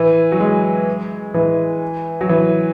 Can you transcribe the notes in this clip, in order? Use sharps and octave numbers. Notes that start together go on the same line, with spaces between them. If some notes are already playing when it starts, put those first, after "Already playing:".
Already playing: E3
F#3
G#3
E3
F#3
E3